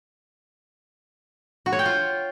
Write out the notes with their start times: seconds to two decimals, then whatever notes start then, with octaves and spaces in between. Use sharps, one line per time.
1.66 F#4
1.73 C#5
1.79 G5
1.85 F4